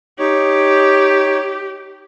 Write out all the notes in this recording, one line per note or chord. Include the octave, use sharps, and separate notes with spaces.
D#4 G4 C#5